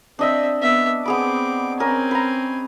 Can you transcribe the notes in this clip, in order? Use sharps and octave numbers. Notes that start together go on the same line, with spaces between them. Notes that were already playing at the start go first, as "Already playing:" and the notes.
C4 D4 D#5 E5 E6
B3 E5
B3 C4 G#4 B5 D6
C4 C#4 A#4 G#5
B4 A#5